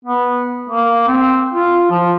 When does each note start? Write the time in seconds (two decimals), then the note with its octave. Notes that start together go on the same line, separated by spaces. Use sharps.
0.05 B3
0.70 A#3
1.08 C4
1.54 F4
1.90 F3